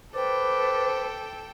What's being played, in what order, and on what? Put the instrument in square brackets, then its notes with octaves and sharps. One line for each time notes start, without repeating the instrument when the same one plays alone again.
[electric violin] A4 G5 [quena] B4 [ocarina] C5 [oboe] D5